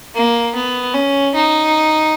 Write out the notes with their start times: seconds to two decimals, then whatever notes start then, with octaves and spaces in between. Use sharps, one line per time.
0.15 A#3
0.55 B3
0.94 C#4
1.34 D#4